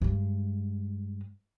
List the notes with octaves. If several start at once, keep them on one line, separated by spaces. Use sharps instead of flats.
G2 G#3